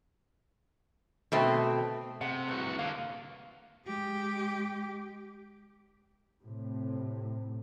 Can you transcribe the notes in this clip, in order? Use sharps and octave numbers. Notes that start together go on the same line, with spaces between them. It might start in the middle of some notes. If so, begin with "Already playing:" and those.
B2 A3 C4
C3 F#5
C2 F#4 B4
D3 A#3 F5
G#3 G4
A2 C3